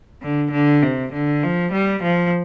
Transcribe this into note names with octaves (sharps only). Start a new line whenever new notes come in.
D3
D3
C3
D3
F3
G3
F3